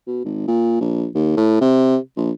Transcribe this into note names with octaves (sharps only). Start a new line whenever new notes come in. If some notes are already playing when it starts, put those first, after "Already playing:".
B2
G#1
A#2
A#1
D#2
A2
C3
A#1